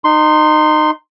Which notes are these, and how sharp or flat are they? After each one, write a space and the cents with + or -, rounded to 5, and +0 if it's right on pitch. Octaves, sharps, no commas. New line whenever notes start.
D#4 -20 C6 +0